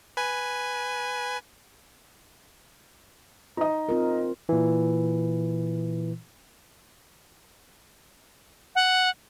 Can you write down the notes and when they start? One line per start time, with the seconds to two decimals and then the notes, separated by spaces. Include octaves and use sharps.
0.17 B4 G#5
3.57 D#4 D#5
3.89 C4 F4 A#4
4.49 A#2 E3
8.75 F#5